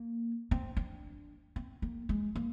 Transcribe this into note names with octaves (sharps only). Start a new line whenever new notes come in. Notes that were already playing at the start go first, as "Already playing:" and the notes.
Already playing: A#3
C4
D4
C4
A#3
G#3
A#3